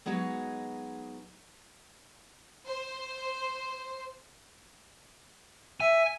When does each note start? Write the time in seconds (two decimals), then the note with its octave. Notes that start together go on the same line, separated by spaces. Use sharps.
0.06 F#3 G#3 B3 D#4 F#4
2.66 C5
5.80 E5 G#5